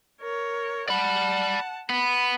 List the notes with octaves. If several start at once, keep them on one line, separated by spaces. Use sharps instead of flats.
A#4 C#5
D5 F#5 A5 B5
B3 B5